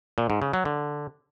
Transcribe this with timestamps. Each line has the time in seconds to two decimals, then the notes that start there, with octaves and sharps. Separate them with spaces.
0.18 A#2
0.30 G#2
0.42 C#3
0.53 F#3
0.65 D3